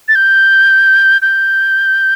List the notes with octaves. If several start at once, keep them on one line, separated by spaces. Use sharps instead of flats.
A6
G6
G6